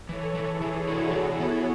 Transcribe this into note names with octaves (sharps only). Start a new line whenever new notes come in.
E3 A4 C#5
E3
E4 G#4
E3
D4 F#4 A4
E3
E4 G#4
B3